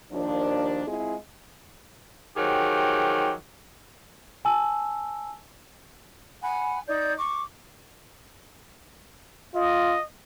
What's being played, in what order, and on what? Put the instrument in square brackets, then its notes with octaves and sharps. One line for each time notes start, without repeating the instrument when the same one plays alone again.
[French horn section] D#2 F3 D4
G#3 C4 E4 F4 G#4
[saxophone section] D#3 F3 F#3 G4 G#4
[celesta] G#5 A5 E6
[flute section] F#5 G#5 B5
D#4 D5 G6
C#6 D6
[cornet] F4 [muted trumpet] D#5